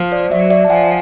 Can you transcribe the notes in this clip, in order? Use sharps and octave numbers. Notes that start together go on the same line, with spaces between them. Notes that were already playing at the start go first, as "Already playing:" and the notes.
Already playing: F3
C5 D5
F#3 D5 E5
D5 E5
A5
F3 F#5 G#5